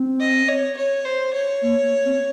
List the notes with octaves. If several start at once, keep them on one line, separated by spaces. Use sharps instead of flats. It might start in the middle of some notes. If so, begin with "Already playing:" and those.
Already playing: C4
D#5
C#5
C#5
C5
C#5
A#3
C4